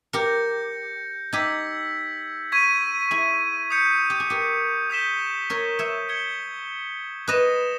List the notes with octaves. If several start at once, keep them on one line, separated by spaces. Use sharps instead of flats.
G4 A#4 G6 A#6 C#7
D#4 G4 E6 G#6 B6
C#6 G#6 B6 D#7
E4 G#4
D#6 G6 C#7
G4
G#4
G4 A#4
D#6 G6 B6 E7 G7
A#4 C#5
C#5 E5
G#6 C#7 G7
B4 D#5 D#6 A#6 E7